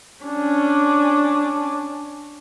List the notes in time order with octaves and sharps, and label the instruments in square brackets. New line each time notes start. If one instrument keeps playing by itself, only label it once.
[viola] C#4 D4